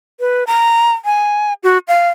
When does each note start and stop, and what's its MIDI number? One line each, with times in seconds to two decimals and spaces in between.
0.20 0.44 71
0.47 0.92 82
1.05 1.53 80
1.63 1.78 66
1.88 2.09 77